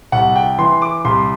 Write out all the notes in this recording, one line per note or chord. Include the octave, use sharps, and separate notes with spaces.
C2 F#5
G5
E3 C6
D6
C2 C6